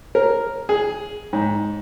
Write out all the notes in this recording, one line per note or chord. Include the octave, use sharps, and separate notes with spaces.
A#4
G#4
G#2